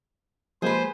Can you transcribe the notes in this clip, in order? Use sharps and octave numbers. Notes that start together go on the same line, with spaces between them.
F3 G#3 A#3 G#4 B4 C5